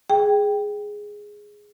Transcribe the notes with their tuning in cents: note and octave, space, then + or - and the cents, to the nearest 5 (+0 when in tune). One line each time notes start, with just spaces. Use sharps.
G#4 +0 G5 +0